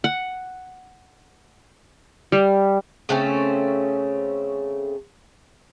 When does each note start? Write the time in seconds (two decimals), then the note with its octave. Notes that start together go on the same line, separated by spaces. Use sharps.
0.04 F#5
2.32 G3
3.09 C#3 A3 C4 C#4